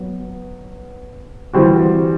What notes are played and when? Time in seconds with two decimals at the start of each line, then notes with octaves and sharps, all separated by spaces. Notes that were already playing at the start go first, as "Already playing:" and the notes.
Already playing: F#3 B3
1.53 E3 G3 C4 F#4